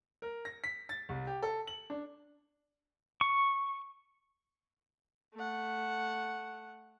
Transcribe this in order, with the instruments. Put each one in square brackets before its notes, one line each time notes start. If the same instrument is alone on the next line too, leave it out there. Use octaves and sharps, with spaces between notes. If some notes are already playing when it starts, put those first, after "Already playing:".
[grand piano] A#4
A#6
B6
A6
C2
G4
A4
F#7
D4
[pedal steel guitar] C#6
[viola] A3 F#5